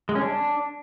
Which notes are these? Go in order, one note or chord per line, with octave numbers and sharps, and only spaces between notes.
G#3
C#4
D4